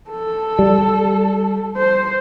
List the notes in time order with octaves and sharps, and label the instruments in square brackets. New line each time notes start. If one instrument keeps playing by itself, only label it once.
[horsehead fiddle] A4
[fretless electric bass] G3
[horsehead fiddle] C5